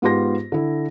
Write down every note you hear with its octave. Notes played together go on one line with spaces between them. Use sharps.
G#2 B3 F4 G4 C6 A#6
D3 E4